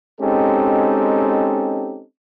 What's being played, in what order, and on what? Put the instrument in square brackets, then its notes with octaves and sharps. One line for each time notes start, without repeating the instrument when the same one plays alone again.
[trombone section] G#3 C4 C#4 D#4 G4 A4